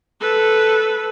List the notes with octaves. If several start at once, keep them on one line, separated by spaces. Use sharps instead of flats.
A4 B4